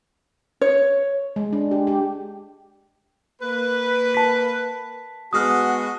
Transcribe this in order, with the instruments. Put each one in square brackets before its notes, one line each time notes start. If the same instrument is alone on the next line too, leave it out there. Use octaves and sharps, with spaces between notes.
[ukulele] C#5
[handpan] G#3
D4
G4
G4
[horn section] A#3 B4
[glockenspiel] A5 B6
[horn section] G#3 B3 F#4 [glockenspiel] D#6 F6